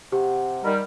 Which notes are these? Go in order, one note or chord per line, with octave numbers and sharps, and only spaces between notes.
C3 G4 F#5
D#3 G3 A#4